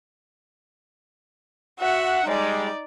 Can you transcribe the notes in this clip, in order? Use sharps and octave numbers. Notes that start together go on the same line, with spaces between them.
F#4 E5 F#5
G3 G#3 D#4 D5